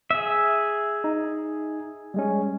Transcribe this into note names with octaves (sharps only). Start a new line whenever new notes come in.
G#4 E5
D#4
G3 G#3 C#4